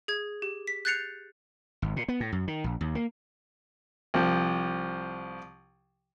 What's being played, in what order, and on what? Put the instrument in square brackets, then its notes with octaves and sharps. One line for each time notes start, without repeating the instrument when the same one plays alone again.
[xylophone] G#4 G#6
G4
B6
F#6 G6 A6 C7 C#7 F7
[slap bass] G#1
A#2
B3
A2
F#2
D#3
A#1
D#2
A#3
[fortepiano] C2 F3